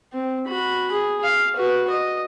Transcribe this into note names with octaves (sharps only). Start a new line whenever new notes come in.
C4
F#4 B5
G#4
F5
F#4 B4
D#5